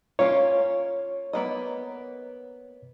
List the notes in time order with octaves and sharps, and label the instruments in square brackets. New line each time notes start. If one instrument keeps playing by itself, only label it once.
[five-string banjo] A#3 C#4 F4 [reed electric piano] C#5
[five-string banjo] A#3 B3 D#5